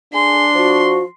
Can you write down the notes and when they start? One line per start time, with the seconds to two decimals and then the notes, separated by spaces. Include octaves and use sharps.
0.14 D4 G#4 C6
0.55 F3 F#4